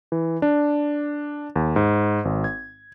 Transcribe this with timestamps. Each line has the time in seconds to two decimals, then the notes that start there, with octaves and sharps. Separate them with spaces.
0.12 E3
0.42 D4
1.56 D#2
1.76 G#2
2.25 G#1
2.44 G#6